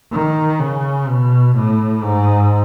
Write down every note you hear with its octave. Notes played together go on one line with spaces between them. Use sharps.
D#3
C#3
B2
A2
G#2